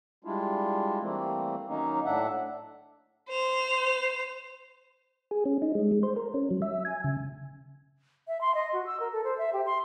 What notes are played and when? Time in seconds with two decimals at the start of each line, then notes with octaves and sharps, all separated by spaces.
0.24 G3 G#3 D4 E4 F4
1.01 E3 G3 A3 A#3 C4
1.68 D#3 F#3 A#3 C#4 D#4
2.05 A2 D4 E5 F#5
3.29 C5 F7
5.31 G#4
5.45 C#4
5.62 D#4
5.75 G#3
5.92 G#3
6.03 C5
6.16 A#4
6.34 C#4
6.51 F#3
6.62 E5
6.85 G#5
7.04 C#3
8.28 E5
8.41 C6
8.55 D#5
8.73 F#4
8.86 E6
9.00 A#4
9.13 A4
9.24 C5
9.38 E5
9.53 G4
9.66 C6